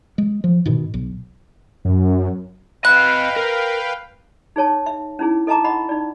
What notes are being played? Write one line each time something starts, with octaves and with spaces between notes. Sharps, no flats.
G#3
F3
G#2 B2 D#3
B1
F#2
B4 D#5 F5 G5 B5 F#6
A#4
D#4 G#4 C#5 A5
E5
C#4 D#4 E4 G#4
A4 D#5 E5 A5 A#5 D6
D#5 F#5 B5 C#6
D#4 D5